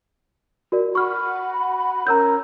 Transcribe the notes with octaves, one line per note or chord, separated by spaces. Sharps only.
F#4 A#4 D5
F#4 F#5 B5 C#6 F6
C#4 A#4 C#5 A#5 E6 G6